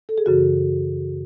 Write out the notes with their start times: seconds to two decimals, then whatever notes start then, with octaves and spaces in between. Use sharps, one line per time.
0.09 A4
0.18 G#4
0.26 F#2 C#3 E3 F#4